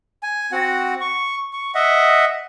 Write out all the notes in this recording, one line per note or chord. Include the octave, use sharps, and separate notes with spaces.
G#5
C4 F#4 F#5
C#6
C#6
D#5 E5 F#5